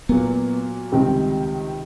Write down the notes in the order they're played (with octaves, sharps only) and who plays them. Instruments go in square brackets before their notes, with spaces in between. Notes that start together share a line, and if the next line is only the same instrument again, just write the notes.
[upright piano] A#2 F#3 A#3 [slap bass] B3
[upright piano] C#2 C3 D#3 G3 C4